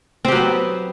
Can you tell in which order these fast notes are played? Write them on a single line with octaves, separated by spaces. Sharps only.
C4 G4 F#3 B3